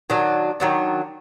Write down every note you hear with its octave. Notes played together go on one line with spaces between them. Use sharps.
D#3 F#3 D4
D#3 F#3 D4